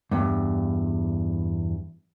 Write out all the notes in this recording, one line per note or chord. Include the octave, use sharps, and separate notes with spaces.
E2 G2